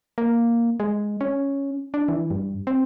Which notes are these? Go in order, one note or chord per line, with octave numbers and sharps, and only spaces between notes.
A#3
G#3
C#4
D4
E3
G2
C4